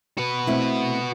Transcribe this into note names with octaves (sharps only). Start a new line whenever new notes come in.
F#4 B4
A3 C4 E4